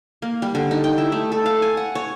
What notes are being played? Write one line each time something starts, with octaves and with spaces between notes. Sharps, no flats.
A#3
G3
D3
D#4
G5
E4
A3
A4
F5
G#5
F#5
C#5